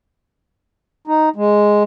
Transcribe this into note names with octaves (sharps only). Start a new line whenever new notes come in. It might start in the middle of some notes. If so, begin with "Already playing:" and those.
D#4
G#3